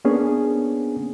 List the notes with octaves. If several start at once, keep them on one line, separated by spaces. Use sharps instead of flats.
A#3 B3 C#4 D4 G#4